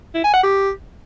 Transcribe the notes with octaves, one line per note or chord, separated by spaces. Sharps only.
E4
G#5
F#5
G4